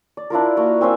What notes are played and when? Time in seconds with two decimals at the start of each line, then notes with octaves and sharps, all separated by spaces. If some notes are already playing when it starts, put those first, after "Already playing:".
0.17 D5
0.30 D4 E4 F4 A#4
0.57 A#3 F#4
0.81 C4 C#4 F4 E5